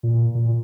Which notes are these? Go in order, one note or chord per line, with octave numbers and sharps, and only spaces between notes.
A#2
A#2